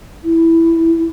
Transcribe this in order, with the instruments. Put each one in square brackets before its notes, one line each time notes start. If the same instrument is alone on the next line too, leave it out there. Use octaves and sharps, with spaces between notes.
[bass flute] E4